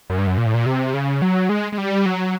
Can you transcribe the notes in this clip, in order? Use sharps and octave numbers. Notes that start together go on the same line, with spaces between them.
F#2
G2
F#2
A#2
A2
A#2
C3
C#3
F#3
G#3
G#3
G3
F#3